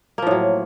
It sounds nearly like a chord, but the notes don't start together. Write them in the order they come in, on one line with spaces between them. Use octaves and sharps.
A#3 F3 A2 F#3